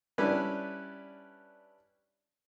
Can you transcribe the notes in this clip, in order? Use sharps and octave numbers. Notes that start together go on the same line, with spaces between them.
G3 C#4 D4 E4 B4 D5